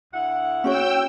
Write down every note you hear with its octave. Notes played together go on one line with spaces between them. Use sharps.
D2 E4 F#5
C#4 F#4 C#5 G5 E6